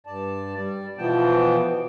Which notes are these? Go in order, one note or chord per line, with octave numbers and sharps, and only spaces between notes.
G2 D5 A5
G3 D5
B2 E3 F3 B3 G5 A5